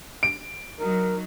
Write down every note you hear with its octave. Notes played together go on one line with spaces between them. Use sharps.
D7
F#3 D#4 A#4